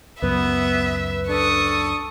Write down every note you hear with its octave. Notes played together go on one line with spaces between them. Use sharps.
C#2 F#2 B3 B4 E5
D4 A4 C#6 D#6